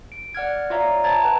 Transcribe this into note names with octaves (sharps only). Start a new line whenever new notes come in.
D7
D5 F#5 F6 G#6
F4 C#5 D5 E5 F5 A#5
C5 E5 A5 A#5 G#6 A6
B4 G5 A5